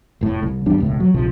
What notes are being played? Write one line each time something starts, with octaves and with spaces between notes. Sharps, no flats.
F1 A2
C2
G#1 E2 G3 D4
E1 C#2 A2
F#3
A#1 C3 F3